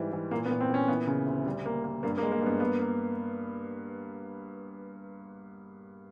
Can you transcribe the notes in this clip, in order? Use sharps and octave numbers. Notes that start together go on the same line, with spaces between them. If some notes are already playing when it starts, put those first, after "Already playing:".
Already playing: G#2 E3 G3
E3
A#2 A#3
B3
A#2
C4
A#2 C#4
E3 B3
C#3
D2
G3
A#3
A#3
G2 A#3
A#3
G#3
A#3
G2 B3
A#3 B3
A#3